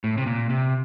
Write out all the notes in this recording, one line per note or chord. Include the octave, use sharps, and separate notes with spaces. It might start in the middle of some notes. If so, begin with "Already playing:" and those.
A2
C3
A#2
C3